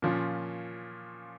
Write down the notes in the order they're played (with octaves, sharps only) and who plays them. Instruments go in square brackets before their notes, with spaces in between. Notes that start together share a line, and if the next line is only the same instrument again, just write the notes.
[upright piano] A#2 F3 C#4